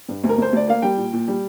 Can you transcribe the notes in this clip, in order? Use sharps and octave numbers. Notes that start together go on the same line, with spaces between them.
G2
D2
A#4
D2 C5
D2 D5
A#3 F5
G3 G5
A#2
A#2
G3